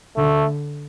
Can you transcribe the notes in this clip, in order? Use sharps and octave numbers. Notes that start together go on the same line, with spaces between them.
D3 A3